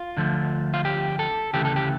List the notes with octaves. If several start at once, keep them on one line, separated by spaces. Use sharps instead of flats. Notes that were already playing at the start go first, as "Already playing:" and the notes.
Already playing: F4
D2 D3 F3 A3
F4
G4
A4
D2 C#3 E3 A3 G4
A4
G4